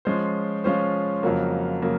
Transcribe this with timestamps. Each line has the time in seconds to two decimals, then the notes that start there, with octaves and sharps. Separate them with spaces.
0.05 F3 G#3 C#4 F4 C5
0.64 F3 G#3 C#4 F4 C5
1.23 F2 C#3 F#3 A#3
1.82 C#3 F#3 A#3